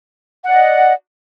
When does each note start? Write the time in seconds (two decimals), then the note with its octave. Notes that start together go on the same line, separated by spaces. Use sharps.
0.44 F#5
0.48 D5
0.52 D#5